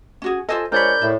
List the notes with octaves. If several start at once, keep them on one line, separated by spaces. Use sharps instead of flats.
C#4 F#4 G#4
F4 A4 C5 D#5 G#5 E6
F3 G#3 D4 A#4 C#5 D5 B5 G6
A2 A4